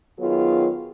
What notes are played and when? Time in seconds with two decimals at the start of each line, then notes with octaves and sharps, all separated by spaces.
0.17 D#3 F#3 B3 F4 G#4